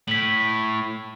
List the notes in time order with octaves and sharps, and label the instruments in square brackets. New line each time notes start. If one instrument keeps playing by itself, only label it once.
[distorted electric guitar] A2 [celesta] B6 F#7